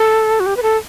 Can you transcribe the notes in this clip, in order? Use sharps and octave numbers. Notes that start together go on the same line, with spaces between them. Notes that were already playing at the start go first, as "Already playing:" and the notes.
Already playing: A4
F#4
G4
B4
A4